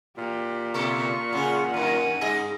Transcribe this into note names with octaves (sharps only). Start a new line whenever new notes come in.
A#2 G4
B2 A4 C#6
C#3 C#4 G#4 F#5
F#2 D#3 D#7
G2 G#4 D#5